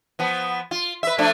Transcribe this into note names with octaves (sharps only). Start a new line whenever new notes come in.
F3 B3
F4
B4 E5
F3 A3 D4